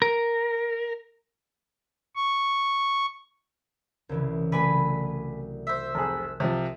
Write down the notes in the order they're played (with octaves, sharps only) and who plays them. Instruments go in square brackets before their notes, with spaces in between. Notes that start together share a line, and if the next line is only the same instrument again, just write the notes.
[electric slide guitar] A#4
[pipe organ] C#6
[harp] C2 C#3 E3
[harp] F#3 A3 D5 [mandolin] B4 G#5 B5
[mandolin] C5 E5
[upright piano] F1 G#4 [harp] F#6
[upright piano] C3 F3 [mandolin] D#5